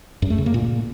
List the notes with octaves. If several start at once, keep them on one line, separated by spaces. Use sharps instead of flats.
F#2
A3
C#3
A#3
A#2